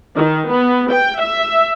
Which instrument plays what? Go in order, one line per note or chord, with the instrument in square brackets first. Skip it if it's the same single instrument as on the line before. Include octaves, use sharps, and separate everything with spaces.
[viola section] D#3
B3
G5
E5